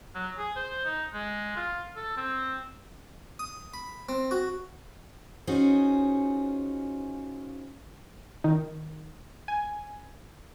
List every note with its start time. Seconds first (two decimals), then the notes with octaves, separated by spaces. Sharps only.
0.14 F#3
0.38 G#4
0.56 C5
0.85 D#4
1.14 G#3
1.56 F4
1.96 A4
2.17 C4
3.39 D#6
3.74 B5
4.09 C4
4.31 F#4
5.47 C#4 D#4 F4 F#4 G#4 C5
8.44 D#3
9.48 G#5